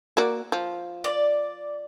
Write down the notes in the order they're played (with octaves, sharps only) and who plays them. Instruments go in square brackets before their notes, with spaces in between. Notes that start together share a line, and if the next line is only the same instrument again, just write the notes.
[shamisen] A#3 F#4 D5
F3
[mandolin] D5